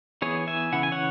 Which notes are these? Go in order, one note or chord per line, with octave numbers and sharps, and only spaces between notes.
E3 B3 E4 G#4 C#5
E5 G#5
C#3 E3 C#4 E4 F#5
G#5
C#5 F#5